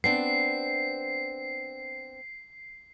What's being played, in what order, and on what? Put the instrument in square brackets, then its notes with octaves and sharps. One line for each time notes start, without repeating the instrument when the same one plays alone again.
[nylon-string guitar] B3 C4 D4 [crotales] C7